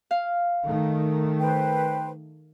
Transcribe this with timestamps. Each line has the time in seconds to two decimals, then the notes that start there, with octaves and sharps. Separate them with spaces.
0.11 F5
0.64 D#3 A3
1.39 B4 C5 G5